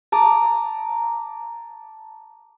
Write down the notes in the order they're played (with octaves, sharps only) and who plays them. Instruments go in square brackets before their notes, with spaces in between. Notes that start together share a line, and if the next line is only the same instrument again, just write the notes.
[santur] A5 A#5 D6 D#6